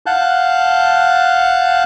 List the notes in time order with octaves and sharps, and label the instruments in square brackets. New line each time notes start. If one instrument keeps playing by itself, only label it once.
[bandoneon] F5 F#5 A5 F#6 G6